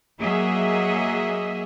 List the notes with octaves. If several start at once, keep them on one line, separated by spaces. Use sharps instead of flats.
F#3 A#3 G#4 D#5 E5